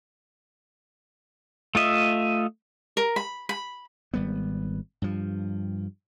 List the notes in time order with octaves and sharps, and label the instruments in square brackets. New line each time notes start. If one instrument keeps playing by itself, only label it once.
[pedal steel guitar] A3 F4 D#5 E5
[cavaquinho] A#4
B5
B5
[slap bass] G#1 G3 B3
G2 F3